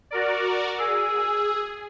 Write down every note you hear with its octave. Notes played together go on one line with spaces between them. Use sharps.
F#4 A#4 D5
G#4 E6